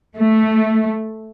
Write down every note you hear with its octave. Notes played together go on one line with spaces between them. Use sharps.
A3